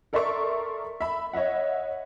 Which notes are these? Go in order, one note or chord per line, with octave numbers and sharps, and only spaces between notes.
A4 A#4 D5 E5 C6 C#6
E5 B5
C#5 D#5 E5 F#5